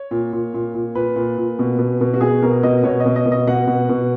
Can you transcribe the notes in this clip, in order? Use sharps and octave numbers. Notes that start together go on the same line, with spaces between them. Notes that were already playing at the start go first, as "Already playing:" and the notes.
Already playing: C#5
A#2
A#2
A#2
A#2
A#2 B4
A#2
A#2
B2
B2
B2
F#4
B2 G#4
B2 A#4
B2 D#5
B2 C#5
D#5
B2
D#5
B2
D#5
B2 F#5
B2
B2